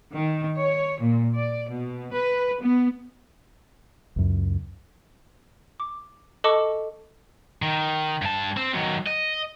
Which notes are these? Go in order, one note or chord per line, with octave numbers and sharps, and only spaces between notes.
D#3
C#5
A#2
D5
B2
B4
B3
C#2 F#2
D6
A4 D#5 A5 C#6 D6 C#7
D#3
G2 A5
C4
D#3 F#3
D#5